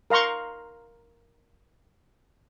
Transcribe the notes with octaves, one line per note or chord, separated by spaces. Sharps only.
A#4 F5 A#5 C6 C#6